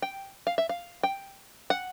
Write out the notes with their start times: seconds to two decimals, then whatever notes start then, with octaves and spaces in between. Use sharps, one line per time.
0.02 G5
0.47 F5
0.58 E5
0.69 F5
1.03 G5
1.70 F#5